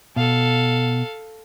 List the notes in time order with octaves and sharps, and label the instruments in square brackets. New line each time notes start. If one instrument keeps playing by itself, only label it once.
[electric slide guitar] B2 [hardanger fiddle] A4 F5